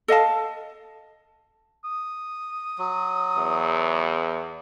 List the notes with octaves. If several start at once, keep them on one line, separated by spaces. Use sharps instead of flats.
A4 D#5 F5 A5
D#6
F#3
E2